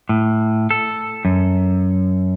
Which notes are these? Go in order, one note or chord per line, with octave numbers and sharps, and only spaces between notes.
A2
A4
F#2